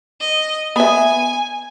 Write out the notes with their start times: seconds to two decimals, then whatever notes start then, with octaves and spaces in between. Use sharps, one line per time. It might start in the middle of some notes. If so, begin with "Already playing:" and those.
0.20 D#5
0.76 B3 E5 G#5